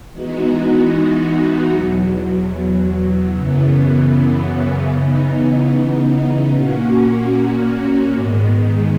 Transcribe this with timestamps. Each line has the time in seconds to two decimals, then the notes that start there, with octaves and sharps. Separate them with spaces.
0.12 E3 G#3 B3 D#4 F#4
1.71 E2 B2 F#3
3.31 F#2 C#3 E3 B3
4.90 C#3 E3 B3 D#4
6.50 A#2 A#3 C#4 F#4
8.10 G#2 D#3 G#3 B3